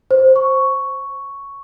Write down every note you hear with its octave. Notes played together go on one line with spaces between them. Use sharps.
C5
C#6